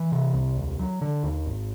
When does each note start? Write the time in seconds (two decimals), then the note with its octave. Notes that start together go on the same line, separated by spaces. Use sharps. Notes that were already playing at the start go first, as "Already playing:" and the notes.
Already playing: E3
0.12 C3
0.34 C2
0.57 D#2
0.79 F#3
1.01 D3
1.24 D#2
1.46 G#1